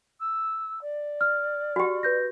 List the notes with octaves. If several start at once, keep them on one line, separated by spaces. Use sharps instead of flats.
E6
D5
F6
F#4 G4
B4 G6 A#6